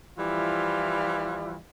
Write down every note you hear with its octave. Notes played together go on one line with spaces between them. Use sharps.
E3 F3 G3 E4 F4